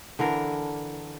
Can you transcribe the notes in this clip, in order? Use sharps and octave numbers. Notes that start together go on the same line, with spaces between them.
D3 E3 D4 A#4